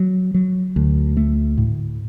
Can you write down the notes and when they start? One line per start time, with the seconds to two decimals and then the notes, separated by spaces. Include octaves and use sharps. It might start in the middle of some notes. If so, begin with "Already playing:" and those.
Already playing: F#3
0.34 F#3
0.76 D2
1.17 A3
1.58 A2